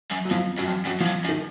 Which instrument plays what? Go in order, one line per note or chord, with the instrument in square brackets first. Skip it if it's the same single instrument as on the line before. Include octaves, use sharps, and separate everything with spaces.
[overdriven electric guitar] F#2
[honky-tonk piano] F#3
[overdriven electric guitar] F2 [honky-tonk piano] F3
[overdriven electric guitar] F#2 [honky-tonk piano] F#3
[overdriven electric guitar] F2
[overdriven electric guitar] F#2 [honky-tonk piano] F#3
[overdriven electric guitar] E2 [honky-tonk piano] F3
[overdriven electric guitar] F2
F#2
[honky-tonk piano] D#3